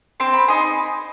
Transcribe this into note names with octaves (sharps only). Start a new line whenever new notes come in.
C4 C6
B5
D#4 G#4 C6